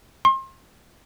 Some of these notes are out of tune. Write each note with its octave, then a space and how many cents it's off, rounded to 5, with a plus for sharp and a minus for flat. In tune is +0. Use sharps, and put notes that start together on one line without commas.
C6 +35